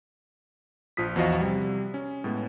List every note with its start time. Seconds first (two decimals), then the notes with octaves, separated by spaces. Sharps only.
0.97 A#1 F3 F4 D#6 B6
1.16 E2 F3 F#4 D#5 F5
1.40 C3 G3
1.94 C#4
2.24 A2 G#3 B3